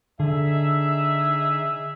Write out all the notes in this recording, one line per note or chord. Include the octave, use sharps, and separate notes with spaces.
D3 D#4 G#4 E5